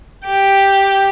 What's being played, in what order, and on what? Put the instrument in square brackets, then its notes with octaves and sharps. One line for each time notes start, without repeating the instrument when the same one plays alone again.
[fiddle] G4